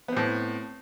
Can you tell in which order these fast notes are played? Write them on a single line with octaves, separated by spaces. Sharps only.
B3 C4 A2